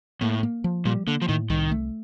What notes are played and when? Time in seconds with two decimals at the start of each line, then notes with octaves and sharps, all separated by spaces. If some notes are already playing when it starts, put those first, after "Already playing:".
0.21 A2 A#3
0.43 A#3
0.64 F3
0.85 A#2 G3
1.07 D3 A#3
1.22 F3
1.28 A2 D#3
1.50 C2 D#3
1.71 A3